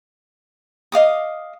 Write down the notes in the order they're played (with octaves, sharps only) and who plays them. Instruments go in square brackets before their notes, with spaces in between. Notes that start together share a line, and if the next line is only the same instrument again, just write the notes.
[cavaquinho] D#5 F5 D6 D#6